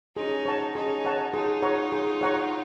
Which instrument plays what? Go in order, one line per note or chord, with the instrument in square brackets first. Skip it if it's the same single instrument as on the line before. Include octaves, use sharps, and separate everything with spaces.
[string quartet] C#4 D#4 [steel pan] G#4
[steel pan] C#5 F#5 A5
[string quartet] C#4 D#4 [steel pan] G#4
[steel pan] C#5 F#5 A5
[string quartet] D#4 F4 [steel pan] G#4
[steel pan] C#5 F#5 A#5 C#6
G#4
C#5 F#5 A#5 C#6